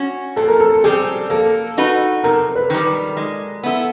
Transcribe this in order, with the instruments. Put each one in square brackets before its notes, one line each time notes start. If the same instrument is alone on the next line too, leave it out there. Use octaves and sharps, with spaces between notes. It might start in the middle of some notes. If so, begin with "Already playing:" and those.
Already playing: [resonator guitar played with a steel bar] C#4 F#4
[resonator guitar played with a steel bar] A#2 [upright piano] A4
[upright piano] A#4
A4
[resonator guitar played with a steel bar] G3 C4 [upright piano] G#4
[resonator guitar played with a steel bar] A#3 [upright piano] A4
[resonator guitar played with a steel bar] D#4 F#4 B4
[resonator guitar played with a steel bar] C3 [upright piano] A#4
[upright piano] B4
[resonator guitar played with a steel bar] D#3 G3
G#3
B3 E4 A4